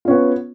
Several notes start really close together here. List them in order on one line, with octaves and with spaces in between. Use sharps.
F4 C#4 B3